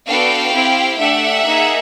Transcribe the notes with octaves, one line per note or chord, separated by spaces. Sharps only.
B3 D4 F#4 A4 F5 G5
C4 E4 G4
A3 D4 G4 E5 F#5
A#3 D#4 G#4